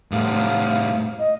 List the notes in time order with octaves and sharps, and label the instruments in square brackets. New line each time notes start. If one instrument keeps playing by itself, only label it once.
[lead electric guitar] A2 G3 [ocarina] F5
[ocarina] D#5